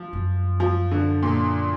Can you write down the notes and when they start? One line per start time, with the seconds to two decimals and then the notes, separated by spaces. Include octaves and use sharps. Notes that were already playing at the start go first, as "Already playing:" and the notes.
Already playing: F3
0.13 F#2
0.60 F3
0.91 D3
1.23 A#2